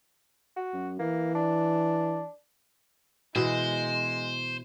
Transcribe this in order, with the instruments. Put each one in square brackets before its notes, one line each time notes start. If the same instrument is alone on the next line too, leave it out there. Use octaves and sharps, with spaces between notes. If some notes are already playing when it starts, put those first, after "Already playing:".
[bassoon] F#4
[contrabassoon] F#2
[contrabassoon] E3 [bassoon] A#3
[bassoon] D4
[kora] B2 E3 [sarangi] G#3 [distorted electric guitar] C5